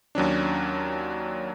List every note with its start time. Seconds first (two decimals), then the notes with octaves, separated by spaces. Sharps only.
0.15 D#2 F#3 C#4 D4